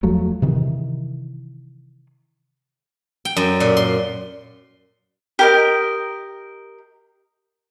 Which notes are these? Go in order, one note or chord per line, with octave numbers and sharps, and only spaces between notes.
E2 F3 F#3 A3
C3 D#3 E3
G5
F#2
A#2
C6
G4 A#4 D#5